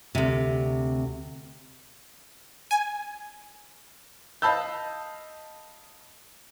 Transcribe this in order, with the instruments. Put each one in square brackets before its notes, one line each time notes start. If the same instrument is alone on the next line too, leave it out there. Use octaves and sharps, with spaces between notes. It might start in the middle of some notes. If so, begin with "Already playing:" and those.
[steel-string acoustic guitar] D2 C3
[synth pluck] G#5
[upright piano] D#5 F5 A5 B5 E6 G6